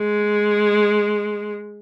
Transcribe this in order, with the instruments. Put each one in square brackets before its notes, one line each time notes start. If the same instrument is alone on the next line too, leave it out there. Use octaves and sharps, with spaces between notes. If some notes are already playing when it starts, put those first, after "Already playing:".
Already playing: [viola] G#3